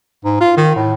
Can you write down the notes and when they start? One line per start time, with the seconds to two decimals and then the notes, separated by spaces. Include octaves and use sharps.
0.25 G#2
0.40 F4
0.57 D#3
0.76 A2